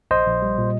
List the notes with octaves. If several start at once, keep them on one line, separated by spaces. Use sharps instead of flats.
A#1 C5 D#5
A#1
G3
A#2